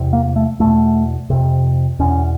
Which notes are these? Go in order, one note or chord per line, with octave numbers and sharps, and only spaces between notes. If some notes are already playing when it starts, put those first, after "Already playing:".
Already playing: E2 C3
A#3
A3
E2 B2 A3
F2 C3
E2 B2 C#4